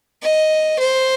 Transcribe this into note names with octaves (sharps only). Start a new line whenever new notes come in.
D#5
C5